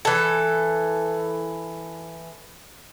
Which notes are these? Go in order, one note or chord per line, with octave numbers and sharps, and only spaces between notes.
E3 A4